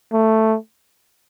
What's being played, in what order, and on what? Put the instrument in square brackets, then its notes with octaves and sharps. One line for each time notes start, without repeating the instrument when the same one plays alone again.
[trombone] A3